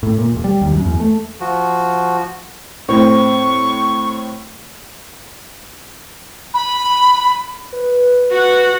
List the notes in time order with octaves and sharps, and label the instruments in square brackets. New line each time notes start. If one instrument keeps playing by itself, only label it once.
[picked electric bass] A2
A#2
E1
G3
D#2
F#2
E2
A3
[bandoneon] F3 F#4
[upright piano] A2 C4 [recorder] C#6
[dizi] B5
[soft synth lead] B4
[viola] F#4 F#5